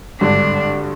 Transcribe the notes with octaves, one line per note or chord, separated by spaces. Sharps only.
G#1 G2 D3 D4